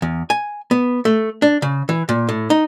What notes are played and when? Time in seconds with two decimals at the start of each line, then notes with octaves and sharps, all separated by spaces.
0.02 E2
0.30 G#5
0.71 B3
1.05 A3
1.42 D4
1.62 C#3
1.89 E3
2.09 A#2
2.29 A2
2.50 D#4